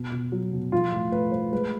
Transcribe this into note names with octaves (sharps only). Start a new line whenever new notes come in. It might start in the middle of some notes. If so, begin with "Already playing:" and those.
Already playing: B2
B2
F#3
B2
F3 F4
A2
A3 B4
A3 C5
G#3 B4